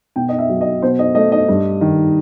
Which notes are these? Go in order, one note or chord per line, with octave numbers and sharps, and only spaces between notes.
B2 G5
D#5
E5
F#3
D#5
B2 C5
D#5
A3 D#5
D#5
G2
D#3